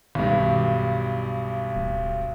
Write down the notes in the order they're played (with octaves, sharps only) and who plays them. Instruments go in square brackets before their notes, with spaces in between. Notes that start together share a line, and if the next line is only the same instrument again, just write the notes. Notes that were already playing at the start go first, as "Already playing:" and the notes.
[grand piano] B1 G2 [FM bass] D#3
[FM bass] D1